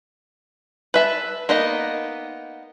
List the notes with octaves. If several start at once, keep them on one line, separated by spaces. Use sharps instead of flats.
B4 E5 A5
A#3 B3 D#4 D#5